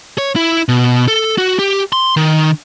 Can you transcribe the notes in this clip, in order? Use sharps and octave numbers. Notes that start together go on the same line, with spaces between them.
C#5
E4
B2
A4
F#4
G4
C6
D#3